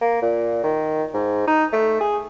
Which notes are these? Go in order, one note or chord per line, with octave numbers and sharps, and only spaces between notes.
A#3
A#2
D#3
G#2
D#4
A3
G#4